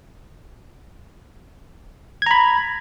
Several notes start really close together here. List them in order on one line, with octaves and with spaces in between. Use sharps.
G#6 A#5 B5